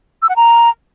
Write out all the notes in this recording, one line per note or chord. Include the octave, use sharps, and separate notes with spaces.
E6
F#5
A#5